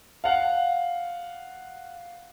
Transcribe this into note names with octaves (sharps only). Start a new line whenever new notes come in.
F5 F#5